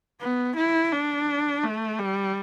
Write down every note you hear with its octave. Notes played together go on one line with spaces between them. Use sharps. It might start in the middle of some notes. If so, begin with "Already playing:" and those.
B3
E4
D4
A3
G3